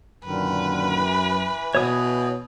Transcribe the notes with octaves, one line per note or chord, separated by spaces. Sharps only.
F#2 A#2 D3 D#3 B4
E3
B2 C#5 D#6